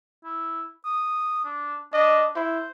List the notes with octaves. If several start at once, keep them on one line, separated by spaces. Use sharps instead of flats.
E4
D#6
D4
D4 D#5
E4 C5